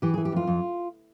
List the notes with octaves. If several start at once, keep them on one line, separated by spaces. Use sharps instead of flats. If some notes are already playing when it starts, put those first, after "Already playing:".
E3 G4
E3 G#4
G4
F2 F4
F2